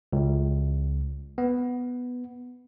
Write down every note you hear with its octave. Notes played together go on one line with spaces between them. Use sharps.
C#2
B3